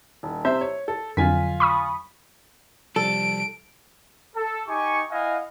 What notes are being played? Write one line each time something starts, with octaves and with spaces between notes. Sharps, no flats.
D#1
C3 C5 E5
C#5
A4
F2 D3 F#3 F4 G#5 B6
B5 C#6 D#6
C3 F3 G3 A4 D7
A4
D#4 G4 G#5 C#6
E4 D#5 F5 F#5 G#5